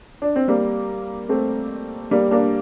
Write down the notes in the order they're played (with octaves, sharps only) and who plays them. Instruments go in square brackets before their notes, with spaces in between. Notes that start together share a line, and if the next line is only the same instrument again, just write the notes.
[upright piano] D4
C4
G3 A#3
A3 C4
G3 A#3
A#3 D4